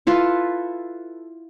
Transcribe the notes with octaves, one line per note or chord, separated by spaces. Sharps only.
E4 F4 A4 B4